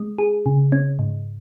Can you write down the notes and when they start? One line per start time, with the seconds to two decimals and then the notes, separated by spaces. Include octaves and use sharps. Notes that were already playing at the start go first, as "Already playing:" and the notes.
Already playing: G#3
0.18 G#4
0.46 C#3
0.72 C#4
0.99 G#2